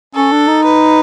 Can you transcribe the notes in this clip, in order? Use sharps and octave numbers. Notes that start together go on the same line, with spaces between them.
C#4 A4
D4
D#4
B4